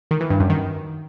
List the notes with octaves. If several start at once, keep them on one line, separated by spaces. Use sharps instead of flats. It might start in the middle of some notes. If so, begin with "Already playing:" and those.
D#3
E3
G2
F#2
D#3